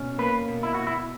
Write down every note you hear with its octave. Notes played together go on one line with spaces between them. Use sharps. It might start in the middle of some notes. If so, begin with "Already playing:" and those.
Already playing: B2 C#4
A#3 B4
B2
E4
B2 F#4
E4